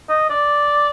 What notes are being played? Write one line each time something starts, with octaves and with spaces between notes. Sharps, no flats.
D#5
D5